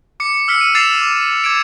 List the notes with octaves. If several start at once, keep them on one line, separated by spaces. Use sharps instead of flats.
D6 C#7
E6 F6 B6 C#7
D#7
D6 E6 A6 C7 E7 F7
D6
D6 G#6 A6 D7 E7